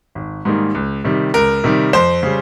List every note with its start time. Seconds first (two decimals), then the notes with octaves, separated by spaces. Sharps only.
0.15 G#1
0.45 G#2 D#3 G3 A#3
0.75 C#2
1.04 C3 D#3 G3
1.34 C#2 A#4
1.64 C3 D#3 G3
1.93 F2 C5
2.23 C#3 G3